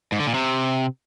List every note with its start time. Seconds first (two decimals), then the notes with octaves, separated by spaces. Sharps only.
0.12 G#2
0.19 D3
0.27 A#2
0.34 C3